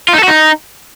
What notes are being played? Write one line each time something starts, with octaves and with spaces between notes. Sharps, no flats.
F4
D#4
A4
F#4
D#4